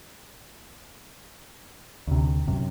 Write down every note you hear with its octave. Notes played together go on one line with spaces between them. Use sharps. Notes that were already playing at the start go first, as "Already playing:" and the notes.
D2 C3
F#2 C3